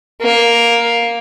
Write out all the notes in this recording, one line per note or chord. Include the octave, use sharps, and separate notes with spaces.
A#3